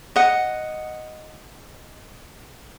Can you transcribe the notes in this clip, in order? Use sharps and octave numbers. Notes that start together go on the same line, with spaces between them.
D#5 F#5